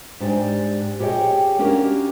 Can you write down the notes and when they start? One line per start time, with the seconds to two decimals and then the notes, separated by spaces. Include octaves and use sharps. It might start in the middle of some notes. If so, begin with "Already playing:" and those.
0.20 G#2 D4 G4 D5 G#5
0.99 F2 G4 G#4 C#5 D#5 G5
1.59 A#3 C#4 D4 F#4 G4 A#4